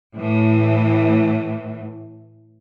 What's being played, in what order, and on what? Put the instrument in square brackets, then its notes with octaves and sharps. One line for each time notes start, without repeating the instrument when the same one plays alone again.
[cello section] A2 E3